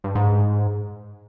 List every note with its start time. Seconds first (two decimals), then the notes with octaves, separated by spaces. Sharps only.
0.04 G2
0.15 G#2